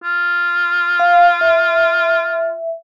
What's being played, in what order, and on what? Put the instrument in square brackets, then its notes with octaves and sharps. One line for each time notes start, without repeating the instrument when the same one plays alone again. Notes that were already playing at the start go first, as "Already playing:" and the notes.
[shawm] F4
[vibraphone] F5
E5